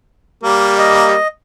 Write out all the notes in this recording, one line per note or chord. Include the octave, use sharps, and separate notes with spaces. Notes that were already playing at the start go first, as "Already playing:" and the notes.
G3 A#3
D#5